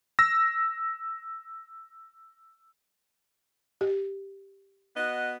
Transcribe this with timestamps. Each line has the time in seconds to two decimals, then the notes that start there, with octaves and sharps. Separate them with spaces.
0.19 E6 A#6
3.81 G4
4.97 B3 F#4 D#5